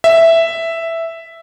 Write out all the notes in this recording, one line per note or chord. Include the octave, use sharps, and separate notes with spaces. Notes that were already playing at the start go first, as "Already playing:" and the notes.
E5